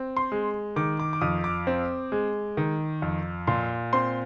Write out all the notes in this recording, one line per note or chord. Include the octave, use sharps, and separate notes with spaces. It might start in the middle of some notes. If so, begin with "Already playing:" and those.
Already playing: C4
C6
G#3
D#3 D6
D6
D6
F2 D#6
D6
C4
G#3
D#3
F2
A#2 C6
C4 C6